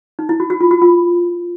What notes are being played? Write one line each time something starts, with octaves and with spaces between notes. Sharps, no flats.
D#4
E4
F#4
F#4
F4
F#4
F4